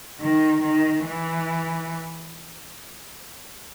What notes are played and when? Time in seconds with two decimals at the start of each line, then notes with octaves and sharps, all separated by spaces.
0.20 D#3
0.62 D#3
1.04 E3